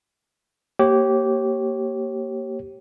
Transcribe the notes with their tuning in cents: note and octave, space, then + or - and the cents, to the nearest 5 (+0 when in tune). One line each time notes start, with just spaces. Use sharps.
A#3 +0 G4 -20 C#5 -30